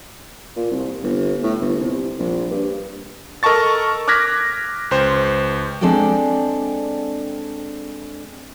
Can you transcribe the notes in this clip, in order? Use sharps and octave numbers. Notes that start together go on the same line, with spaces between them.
A#2
C2
G1
A2
G1
C2
A#1
G2
A4 A#4 D#5 A5 C#6 A6
D6 F6 F#6 G#6 A#6 B6
C#2 C5
G#3 C4 D4 A4 D5 G5